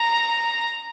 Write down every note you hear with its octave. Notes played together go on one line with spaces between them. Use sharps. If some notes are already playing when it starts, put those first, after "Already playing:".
Already playing: A#5